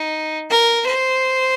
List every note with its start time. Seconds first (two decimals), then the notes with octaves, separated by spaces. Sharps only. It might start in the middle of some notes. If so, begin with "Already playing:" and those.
Already playing: D#4
0.50 A#4
0.86 C5